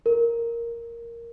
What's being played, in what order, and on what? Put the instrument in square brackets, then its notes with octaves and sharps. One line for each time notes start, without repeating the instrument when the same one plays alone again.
[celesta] A#4